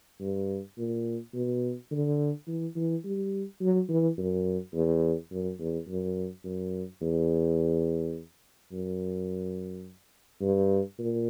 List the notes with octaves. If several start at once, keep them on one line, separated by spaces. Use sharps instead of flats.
G2
A#2
B2
D3
E3
E3
G3
F#3
E3
F#2
E2
F#2
E2
F#2
F#2
E2
F#2
G2
A#2